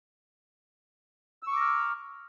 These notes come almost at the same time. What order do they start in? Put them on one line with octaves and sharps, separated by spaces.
E6 C#6 D6 A#5 F6